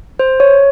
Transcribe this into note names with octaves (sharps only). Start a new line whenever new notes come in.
C5
C#5